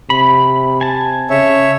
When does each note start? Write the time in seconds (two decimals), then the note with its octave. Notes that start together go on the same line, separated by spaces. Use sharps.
0.10 C3 B5
0.81 G#5 A5
1.30 C#3 C#5 E5